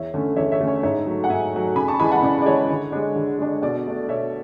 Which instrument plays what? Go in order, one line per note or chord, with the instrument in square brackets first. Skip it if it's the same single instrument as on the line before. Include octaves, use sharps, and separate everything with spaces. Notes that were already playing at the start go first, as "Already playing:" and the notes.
Already playing: [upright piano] E2 C#5 E5
D3 A3 C#4
E2 C#5 E5
C#5 E5
D3 A3 C#4
C#5
G#2 C#5 E5
F#3 A3
F#5
G#2 E5 G#5
F#3 A3
C#3 G#5 B5
A5 C#6
E3 G#3 G#5 B5
F#5 A5
C#3 D5
D5
E3 G#3 C#5
D3
G#3 D4
D3
G#3 D4
B2 D5
A3 D4
B2 C#5 E5